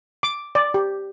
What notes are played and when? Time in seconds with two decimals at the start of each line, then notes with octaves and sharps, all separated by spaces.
0.23 D6
0.55 D5
0.74 G4